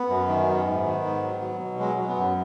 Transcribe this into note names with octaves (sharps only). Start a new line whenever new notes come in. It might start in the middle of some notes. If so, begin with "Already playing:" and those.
Already playing: B3
F#2
D#3
F#2
G#2
D#3
G#2
F#3
F#3
B2
F#3 G#3
F#3
B3
F#2